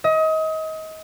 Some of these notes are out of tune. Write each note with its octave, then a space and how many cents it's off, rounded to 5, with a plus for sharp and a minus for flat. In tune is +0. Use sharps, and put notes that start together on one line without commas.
D#5 +30